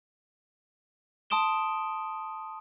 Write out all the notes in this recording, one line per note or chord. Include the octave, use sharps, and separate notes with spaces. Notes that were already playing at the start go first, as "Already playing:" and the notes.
A5 C6 D#6 D7 E7 G7